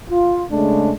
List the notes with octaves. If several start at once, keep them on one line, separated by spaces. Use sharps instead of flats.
F4
C#3 G#3 A3 D4